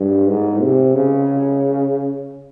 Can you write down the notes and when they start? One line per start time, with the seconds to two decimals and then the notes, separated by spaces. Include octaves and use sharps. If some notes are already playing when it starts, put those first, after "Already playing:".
Already playing: G2
0.28 G#2
0.62 C3
0.95 C#3